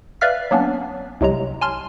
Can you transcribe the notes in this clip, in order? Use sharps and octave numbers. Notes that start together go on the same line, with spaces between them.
B4 D5 E5 F5 F6 B6
F#3 A#3 B3 C#4 D4
C2 C3 F#3 G#3 A#5
G#5 A5 C6 F6